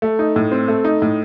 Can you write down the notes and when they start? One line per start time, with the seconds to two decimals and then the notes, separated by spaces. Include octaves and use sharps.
0.02 A3
0.19 D#4
0.36 A2
0.51 C4
0.68 A3
0.84 D#4
1.02 A2